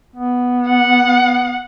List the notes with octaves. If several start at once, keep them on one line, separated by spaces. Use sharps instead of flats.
B3
F#5